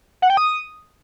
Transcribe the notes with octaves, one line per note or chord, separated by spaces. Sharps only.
F#5
G5
D#6